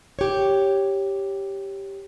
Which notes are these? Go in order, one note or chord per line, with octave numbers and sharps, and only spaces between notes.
G4 C#5